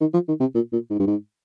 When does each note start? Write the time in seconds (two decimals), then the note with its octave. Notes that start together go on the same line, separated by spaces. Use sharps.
0.01 D#3
0.14 F3
0.28 D#3
0.40 C3
0.55 A#2
0.72 A#2
0.90 G#2
0.99 G2
1.07 G#2